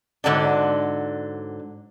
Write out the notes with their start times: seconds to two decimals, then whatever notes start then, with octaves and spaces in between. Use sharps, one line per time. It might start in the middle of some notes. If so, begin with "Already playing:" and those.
0.24 G#2 D3 F#3 D4